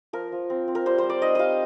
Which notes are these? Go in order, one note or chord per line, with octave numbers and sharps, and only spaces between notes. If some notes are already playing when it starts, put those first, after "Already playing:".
F3 A#4
F3
C4
C4
A#4
G3 C5
G3 C5
D5
D#4 D#5
G3 D#5 F5